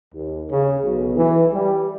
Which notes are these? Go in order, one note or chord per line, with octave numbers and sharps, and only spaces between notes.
D#2
C#3
B1
E3
G3